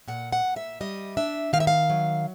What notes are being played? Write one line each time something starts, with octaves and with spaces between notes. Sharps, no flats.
A#2 F#5
F#5
A#2
E5
G3 D#5
D4 E5
D#3 F5
E5
F5
F#3